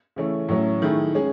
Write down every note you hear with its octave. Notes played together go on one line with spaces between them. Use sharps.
C#3 E3 A3 C#4
A2 F#3 C#4
D#3 A3 E4 G#4
G#3 C#4 G#4